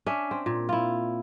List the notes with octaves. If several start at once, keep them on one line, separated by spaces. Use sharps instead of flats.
C#4 D4 E5
C4
A#2
E4 F4